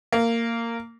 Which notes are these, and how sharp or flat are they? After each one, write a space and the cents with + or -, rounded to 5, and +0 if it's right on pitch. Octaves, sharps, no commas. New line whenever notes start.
A#3 -15